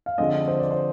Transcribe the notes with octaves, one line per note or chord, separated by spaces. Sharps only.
F5
D3 F3 G#3 C4 D#5
C5
D5
C5